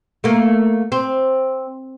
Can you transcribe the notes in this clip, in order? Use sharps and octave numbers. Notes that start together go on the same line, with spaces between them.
A3 A#3
C4